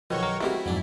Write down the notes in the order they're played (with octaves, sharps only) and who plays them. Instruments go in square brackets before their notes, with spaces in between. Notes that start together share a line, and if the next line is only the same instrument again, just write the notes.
[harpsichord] B1 D#3 [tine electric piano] F3 F#3 [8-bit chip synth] F#4 C#5 C#6
[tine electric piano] A#4
[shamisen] G#3 C4 G4 [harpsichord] A3 C#4 F#4 [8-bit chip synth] E4
[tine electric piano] F2 G#2 [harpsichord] F#3 D4